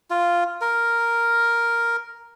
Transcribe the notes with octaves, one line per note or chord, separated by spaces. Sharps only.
F4
A#4